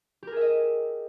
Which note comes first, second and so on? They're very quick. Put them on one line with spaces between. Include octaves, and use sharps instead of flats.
G4 A#4 G#4 E5 D#5